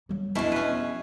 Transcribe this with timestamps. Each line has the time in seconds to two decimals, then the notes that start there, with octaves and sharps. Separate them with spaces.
0.09 F#3 G3
0.35 E2 B2 F3 G#3 C#4 D4 E4
0.52 C#4 B4